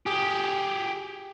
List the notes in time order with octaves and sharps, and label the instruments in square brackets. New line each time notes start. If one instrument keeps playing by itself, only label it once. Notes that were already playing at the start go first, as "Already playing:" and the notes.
[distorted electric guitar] G4 G#4